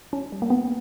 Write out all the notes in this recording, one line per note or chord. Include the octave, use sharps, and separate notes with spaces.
C#4
G3
A#3
B3